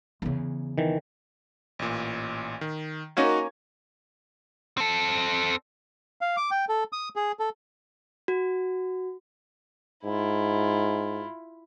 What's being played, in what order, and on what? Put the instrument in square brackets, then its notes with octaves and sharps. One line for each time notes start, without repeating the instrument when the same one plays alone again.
[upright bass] E2 C#3
[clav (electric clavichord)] D#3 E3
[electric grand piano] A1 A#2
D#3
[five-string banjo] A#3 C#4 A#4 [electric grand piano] D#4 F#4 G#6
[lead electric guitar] C4 A4
[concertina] F5
D6
G5
A4
D#6
G#4
A4
[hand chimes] F#4
[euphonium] G#2 [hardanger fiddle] E4 F4